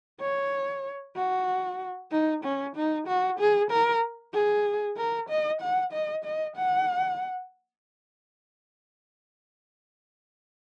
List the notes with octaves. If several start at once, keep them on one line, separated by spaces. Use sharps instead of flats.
C#5
F#4
D#4
C#4
D#4
F#4
G#4
A#4
G#4
A#4
D#5
F#5
D#5
D#5
F#5